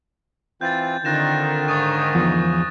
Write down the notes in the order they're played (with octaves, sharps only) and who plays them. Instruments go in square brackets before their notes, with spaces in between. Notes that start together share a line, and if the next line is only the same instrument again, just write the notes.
[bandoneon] E3 C4 F4 [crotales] G6 A6
[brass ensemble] D3 D#3 [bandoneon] C4 F4 [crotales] F#6 A#6 E7
[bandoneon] G#2 C#3 G#5 [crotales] C#6 D#6 A6
[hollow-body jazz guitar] E2 F3